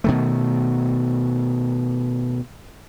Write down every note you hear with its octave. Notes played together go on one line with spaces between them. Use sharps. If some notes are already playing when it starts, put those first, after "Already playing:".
B2 D#3 A3